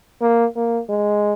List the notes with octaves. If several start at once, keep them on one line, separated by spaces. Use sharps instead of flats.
A#3
A#3
G#3